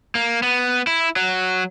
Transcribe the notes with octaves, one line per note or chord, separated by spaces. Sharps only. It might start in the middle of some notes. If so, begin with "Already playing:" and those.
A#3
B3
E4
F#3